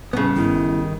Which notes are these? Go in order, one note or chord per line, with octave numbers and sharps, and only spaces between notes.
A2 C#3 G3 B3
G1 D#3 E4